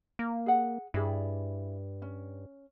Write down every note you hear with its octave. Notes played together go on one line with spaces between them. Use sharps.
A#3
G#4 F#5
G2 E4 G#4 D5
C#4